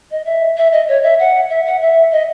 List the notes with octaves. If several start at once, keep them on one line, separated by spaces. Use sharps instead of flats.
D#5
E5
E5
D#5
C#5
E5
F#5
E5
F#5
E5
D#5